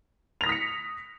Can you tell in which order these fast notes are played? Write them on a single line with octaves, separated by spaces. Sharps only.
F7 A#6 D#6 B6 C#7